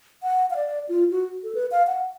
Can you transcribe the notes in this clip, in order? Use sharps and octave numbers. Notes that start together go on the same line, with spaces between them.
F#5
F5
D5
F4
F#4
A4
B4
F5
F#5